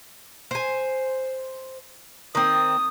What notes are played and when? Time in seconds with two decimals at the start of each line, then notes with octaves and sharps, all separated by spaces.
0.51 C5 G#5
2.35 D#3 C4 D#6